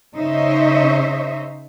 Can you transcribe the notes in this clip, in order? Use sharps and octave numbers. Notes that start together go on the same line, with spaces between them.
C#3 D#4 C5 C#5 D#5 E5